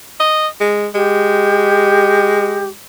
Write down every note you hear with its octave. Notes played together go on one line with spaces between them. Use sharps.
D#5
G#3
G#3 G4